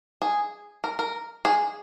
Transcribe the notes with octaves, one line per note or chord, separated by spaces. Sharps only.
G#4
A#4
A#4
G#4